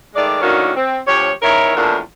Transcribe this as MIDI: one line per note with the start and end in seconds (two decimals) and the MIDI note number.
0.15 0.41 51
0.15 0.41 56
0.15 0.41 57
0.15 0.41 74
0.42 0.71 45
0.42 0.71 51
0.42 0.71 58
0.42 0.71 61
0.42 0.71 62
0.42 0.71 66
0.76 0.99 60
1.07 1.31 38
1.07 1.31 53
1.07 1.31 67
1.07 1.31 73
1.42 1.74 40
1.42 1.74 51
1.42 1.74 64
1.42 1.74 70
1.42 1.74 73
1.76 1.98 40
1.76 1.98 45
1.76 1.98 53
1.76 1.98 58
1.76 1.98 62
1.76 1.98 70